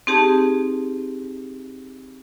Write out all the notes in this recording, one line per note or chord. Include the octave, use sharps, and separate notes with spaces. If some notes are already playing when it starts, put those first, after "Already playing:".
C4 D#4 G4 G#4 A5